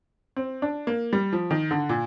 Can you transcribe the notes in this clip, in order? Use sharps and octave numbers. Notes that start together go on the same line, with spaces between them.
C4
D4
A#3
G3
F3
D#3
D3
A#2